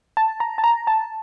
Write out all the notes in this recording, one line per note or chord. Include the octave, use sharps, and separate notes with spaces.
A5
A#5
A5
A#5
A5